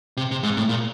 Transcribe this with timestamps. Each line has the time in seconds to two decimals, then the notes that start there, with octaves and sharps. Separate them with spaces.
0.17 C3
0.31 C3
0.43 G#2
0.57 A2
0.69 A#2